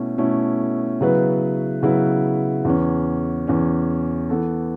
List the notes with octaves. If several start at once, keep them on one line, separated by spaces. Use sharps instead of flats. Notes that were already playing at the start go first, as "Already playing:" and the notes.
Already playing: B2 A3 C#4 E4
B2 A3 C#4 E4 A4
C#3 F#3 B3 E4 B4
C#3 F#3 B3 E4 B4
E2 E3 C#4
E2 E3 C#4
E3 B3 A4